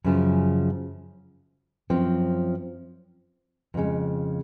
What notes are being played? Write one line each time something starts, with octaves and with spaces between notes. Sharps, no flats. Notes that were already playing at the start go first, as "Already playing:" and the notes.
F#2 C#3 F3
F#2 F3 C4
F2 C#3 G#3